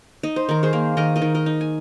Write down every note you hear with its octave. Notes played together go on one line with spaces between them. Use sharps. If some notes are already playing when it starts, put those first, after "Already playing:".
D#4 D#5
C5
D#3 A#4
G#4 C5
A#3
D#3 A#4 D#5
A#4 D#5
D#3
A#4 D#5
D#4
G#5